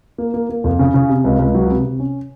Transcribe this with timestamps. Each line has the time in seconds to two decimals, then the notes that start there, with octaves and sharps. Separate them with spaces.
0.18 A#3
0.34 A#3
0.49 A#3
0.64 F2
0.79 C#3
0.94 C#3
1.09 C3
1.24 C#2
1.39 C#2
1.54 F#3
1.69 C3
1.85 C3
2.00 C#4